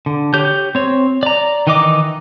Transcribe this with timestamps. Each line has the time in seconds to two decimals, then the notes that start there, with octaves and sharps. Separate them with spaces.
0.06 D3
0.34 G4 C#5 G6
0.75 C4 C#5
1.23 D5 A#5
1.67 D#3 E3 D#4 D#5 D6